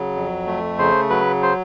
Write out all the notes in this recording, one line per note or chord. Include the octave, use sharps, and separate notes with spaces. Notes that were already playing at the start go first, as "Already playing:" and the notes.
Already playing: C#3 F#3
F2
A3
C#3 C5
F#3 B4
C5